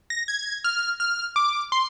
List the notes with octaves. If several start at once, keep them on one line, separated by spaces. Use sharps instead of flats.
A#6
G#6
F6
F6
D6
C6